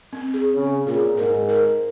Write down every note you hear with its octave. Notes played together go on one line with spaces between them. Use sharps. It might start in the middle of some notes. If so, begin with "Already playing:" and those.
C4
G#4
C#3
A#2 G#4
G#2 A#4
A#4